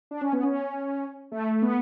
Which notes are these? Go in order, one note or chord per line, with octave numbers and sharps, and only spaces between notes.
D4
C#4
B3
C#4
A3
B3